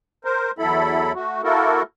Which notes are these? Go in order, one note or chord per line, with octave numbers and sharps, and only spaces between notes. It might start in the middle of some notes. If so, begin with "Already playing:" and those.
A#4 C5
E2 F#3 E4 A4 B5
A3 F#4
A#3 E4 F#4 A4 A#4